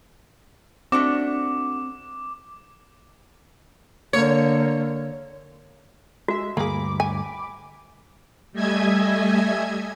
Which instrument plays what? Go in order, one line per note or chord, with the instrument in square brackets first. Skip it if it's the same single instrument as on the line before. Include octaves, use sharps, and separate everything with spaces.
[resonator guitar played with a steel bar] A3 D4 F#4 [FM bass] C4 [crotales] D6
[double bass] D3 A#3 [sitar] C#5
[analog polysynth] G#3 E5 [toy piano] F#4
[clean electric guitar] D2 G2 A#5 [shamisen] A#3 G#4 [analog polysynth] B5 D6
[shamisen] G#5
[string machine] G3 A3 D#5 E5 G#5 G#6